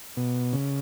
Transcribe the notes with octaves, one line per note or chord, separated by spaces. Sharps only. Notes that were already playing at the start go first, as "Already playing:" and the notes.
B2
C#3